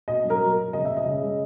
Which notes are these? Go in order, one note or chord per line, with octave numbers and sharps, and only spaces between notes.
B2 D#5
F#3
A#4
F#3
B2
C#3 D#5
E5
C#3
D#5
C#3
G#3